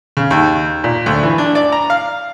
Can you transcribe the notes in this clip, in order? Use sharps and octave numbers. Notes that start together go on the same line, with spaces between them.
C#3
D#2
A#2
D2
E3
D4
D5
A#5
F5